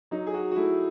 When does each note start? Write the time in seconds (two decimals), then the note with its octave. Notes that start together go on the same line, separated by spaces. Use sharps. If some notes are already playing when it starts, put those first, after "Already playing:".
0.11 F#3 D#4
0.27 G#4
0.34 F#4
0.51 F#4
0.56 A3 E4